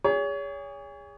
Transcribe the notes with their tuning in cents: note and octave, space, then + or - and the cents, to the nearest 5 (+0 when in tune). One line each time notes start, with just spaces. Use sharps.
G#4 -30 C#5 +30